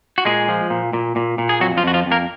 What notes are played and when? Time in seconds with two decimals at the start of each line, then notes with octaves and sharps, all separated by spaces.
0.18 F#4
0.25 A#2 G#3 G#4
0.49 F3
0.70 A#2
0.93 A#2
1.16 A#2
1.38 A#2
1.49 G#4
1.60 F2 F#3 F#4
1.77 F3 F4
1.83 F2 F#4
1.94 F3 F4
2.06 F2
2.11 A#3 A#4